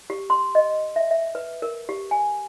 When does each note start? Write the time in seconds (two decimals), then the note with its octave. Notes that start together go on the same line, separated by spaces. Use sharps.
0.10 G4
0.30 C6
0.55 D#5
0.96 E5
1.11 E5
1.35 B4
1.62 A#4
1.89 G4
2.11 G#5